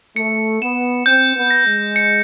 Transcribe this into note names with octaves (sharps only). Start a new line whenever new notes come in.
A3 C#7
B3 E7
C4 G6
B3
A#6
G#3
C#7